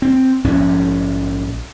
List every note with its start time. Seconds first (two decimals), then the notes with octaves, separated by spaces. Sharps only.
0.02 C4
0.44 A#1 G#2 C#4